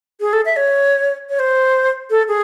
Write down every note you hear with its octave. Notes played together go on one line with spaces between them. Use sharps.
G#4
A4
E5
C#5
C#5
C5
A4
G#4